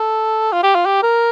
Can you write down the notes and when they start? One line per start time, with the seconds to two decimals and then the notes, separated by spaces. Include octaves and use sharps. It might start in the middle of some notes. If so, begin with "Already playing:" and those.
Already playing: A4
0.53 F4
0.63 G4
0.75 F4
0.86 G4
1.03 A#4